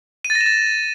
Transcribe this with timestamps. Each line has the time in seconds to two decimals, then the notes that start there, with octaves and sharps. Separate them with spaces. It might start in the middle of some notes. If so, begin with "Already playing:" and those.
0.25 D#7
0.30 A6
0.35 A#6
0.41 E7
0.46 A6